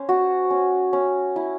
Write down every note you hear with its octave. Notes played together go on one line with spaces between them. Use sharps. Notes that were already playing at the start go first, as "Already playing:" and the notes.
Already playing: C#4 C5
F#4
C#4
C#4
E4